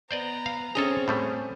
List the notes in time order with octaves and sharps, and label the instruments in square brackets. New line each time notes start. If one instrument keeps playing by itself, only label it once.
[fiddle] B3 A#5 [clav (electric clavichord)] C5 D5 D#5
[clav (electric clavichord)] F5
[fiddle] C4 [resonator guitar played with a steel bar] C#4 G#4 [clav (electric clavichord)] A4 D#5 A#5
[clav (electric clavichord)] A2 G3 A3